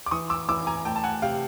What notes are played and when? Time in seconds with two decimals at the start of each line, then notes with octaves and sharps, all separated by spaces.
0.06 D6
0.11 E3 C#6 D#6
0.30 D6 E6
0.48 E3 D6 E6
0.67 G#5 A#5
0.85 A3 G5 A5
0.96 A5
1.04 F#5 G#5
1.22 C3 F5 G5